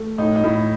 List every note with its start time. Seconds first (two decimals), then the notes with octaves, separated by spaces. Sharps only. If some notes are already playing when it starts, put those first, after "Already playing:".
Already playing: A3
0.18 A2 D#4
0.36 D#4
0.44 A2 E4